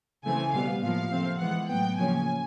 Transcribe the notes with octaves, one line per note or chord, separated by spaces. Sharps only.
C#3 E3 A3 C4 G#5
B2 G3 B3 F5
A2 F3 A#3 F5
C3 F3 A3 C4
E3 G#3 B3 F#5
A2 F#3 B3 G5
C#3 F3 A#3 C#4 G#5